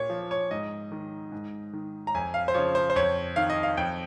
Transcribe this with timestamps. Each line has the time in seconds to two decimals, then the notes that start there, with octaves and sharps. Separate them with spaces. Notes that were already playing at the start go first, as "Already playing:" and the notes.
Already playing: A#2 C#5
0.10 F3
0.31 C#5
0.51 G#2 D#5
0.92 D#3
1.32 G#2
1.73 D#3
2.07 A#5
2.14 F2 G#5
2.34 F5
2.48 C5
2.54 C#3 F3 C#5
2.75 C5
2.90 C5
2.96 F2 C#5
3.36 D#3 F5
3.50 D#5
3.63 F5
3.77 F2 G5